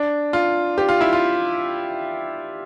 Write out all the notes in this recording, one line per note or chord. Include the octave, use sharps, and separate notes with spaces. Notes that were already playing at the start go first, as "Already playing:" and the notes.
Already playing: D4
F4
G4
F4
E4
F4